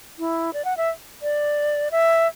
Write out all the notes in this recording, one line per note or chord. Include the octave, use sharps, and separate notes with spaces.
E4
D5
F#5
E5
D5
E5